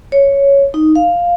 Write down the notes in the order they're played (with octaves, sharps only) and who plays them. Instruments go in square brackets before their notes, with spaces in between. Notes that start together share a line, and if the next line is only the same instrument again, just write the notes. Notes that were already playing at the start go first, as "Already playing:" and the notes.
[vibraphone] C#5
D#4
F5